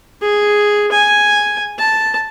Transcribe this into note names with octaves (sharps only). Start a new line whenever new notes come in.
G#4
G#5
A5